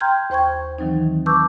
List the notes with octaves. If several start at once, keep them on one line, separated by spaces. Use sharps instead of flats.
G5 A#5 C6 F6 G6 G#6
D#2 C5 G5 C#6 G#6
D#3 E3 F#3 C4 D#4
B4 A5 C#6 D6 E6 G6